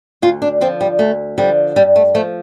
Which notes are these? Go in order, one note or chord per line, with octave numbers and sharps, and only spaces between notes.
D2 F4
D4
D3 F3 C4
G3
D2 A3
D3 F3 G3
G2 G3
A3
F3 A3